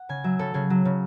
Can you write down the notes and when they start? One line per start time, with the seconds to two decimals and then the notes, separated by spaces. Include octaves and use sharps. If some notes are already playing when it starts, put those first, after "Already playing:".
Already playing: F#5
0.09 C#3 G#5
0.24 F#3 E5
0.39 C#3 A4
0.54 C#3 G#4
0.70 F#3
0.85 C#3